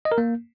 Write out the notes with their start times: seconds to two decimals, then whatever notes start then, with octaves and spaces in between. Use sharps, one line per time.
0.05 D#5
0.12 A#4
0.18 A#3